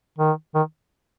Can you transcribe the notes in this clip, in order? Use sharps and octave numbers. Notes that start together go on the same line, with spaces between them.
D#3
D#3